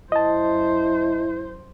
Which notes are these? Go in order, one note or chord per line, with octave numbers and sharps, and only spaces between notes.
F#2 E4 C5 D#5 A5